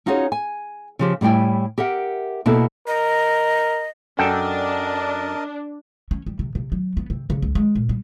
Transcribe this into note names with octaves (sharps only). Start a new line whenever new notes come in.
C#4 D#4 F4 F#4 G#4 C#5
G#5
C#3 F3 G4
A2 G3 E4 G5 G#5
G4 A#4 E5 F#5
B2 A#3 E4 F#4 A4
A#4 D#5
F#2 D4 A4 A#4 D#5 G5 A5
C#4
G3
C3
C3
F#3
B3
C3
C#3
C#2
G#3
A#2
G3